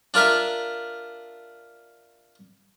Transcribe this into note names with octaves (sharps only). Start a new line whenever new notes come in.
D4 F4 A#4 E5